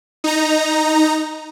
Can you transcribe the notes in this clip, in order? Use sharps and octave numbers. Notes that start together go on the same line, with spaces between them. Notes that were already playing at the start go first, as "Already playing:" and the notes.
D#4 A#5